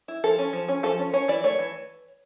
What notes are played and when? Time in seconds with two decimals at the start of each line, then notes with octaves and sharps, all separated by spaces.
0.08 E4
0.24 F3 A4
0.38 C#4
0.53 F3
0.68 C#4
0.83 F3 A4
0.99 C#4
1.13 C#4 C#5
1.28 E3 D5
1.44 A3 C#5
1.59 E3